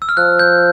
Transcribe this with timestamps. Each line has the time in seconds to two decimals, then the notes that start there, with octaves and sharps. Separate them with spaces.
0.02 E6
0.09 F6
0.17 F3 F#6
0.39 G6